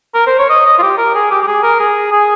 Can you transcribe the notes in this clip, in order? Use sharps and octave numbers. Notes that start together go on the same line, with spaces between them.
A#4
C5
C#5
D#5
D#5
F4
G4
A#4
G#4
G4
G4
G#4
A#4
G#4
G#4